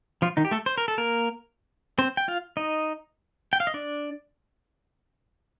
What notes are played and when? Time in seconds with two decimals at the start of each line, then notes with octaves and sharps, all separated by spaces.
0.22 F3 F4
0.37 D#3 D#4
0.45 G4
0.51 A3 A4
0.66 C5
0.78 A#4
0.88 A4
0.98 A#3 A#4
1.98 C4 C5
2.17 G5
2.28 F4 F5
2.57 D#4 D#5
3.53 G5
3.60 F5
3.67 D#5
3.74 D4 D5